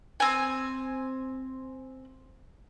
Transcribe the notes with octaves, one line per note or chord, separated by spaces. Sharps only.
C4 G#5